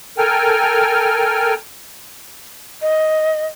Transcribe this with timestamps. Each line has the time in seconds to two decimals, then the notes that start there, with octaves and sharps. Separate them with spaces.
0.18 A4 A#4 G5 G#5 F6
2.81 D#5